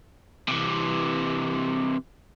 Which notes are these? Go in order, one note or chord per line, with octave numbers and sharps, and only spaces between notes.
C3 E3